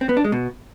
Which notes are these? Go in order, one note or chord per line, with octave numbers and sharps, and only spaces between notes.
C4
B3
D4
G#3
B2